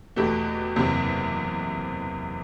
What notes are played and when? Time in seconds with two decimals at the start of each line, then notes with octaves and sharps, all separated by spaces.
0.16 E2 B2 A3 G4
0.76 F#1 E2 C3